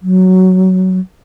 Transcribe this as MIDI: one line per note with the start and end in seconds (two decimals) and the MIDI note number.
0.02 0.99 54